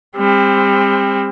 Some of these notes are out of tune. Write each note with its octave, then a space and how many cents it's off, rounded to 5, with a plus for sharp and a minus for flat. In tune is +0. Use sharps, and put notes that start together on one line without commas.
G3 +35 C4 +15